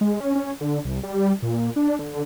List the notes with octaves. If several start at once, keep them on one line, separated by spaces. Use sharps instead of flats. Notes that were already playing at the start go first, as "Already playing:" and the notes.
G#3
C#4
C#4
D3
C2
G3
A#2
D4
D3